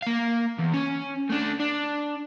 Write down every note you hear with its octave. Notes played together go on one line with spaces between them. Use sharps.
A#3 F5
E2
C#4
A3 D4
D4